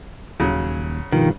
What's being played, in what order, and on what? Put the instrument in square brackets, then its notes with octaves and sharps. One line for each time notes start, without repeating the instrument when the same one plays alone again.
[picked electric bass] D#1 D#2 [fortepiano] C#3 F#3
[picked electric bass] G2 [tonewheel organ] B2 F3 F4 [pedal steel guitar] D#3